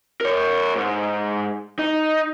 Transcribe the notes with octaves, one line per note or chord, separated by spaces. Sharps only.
A#4 C#5
G#2
D#4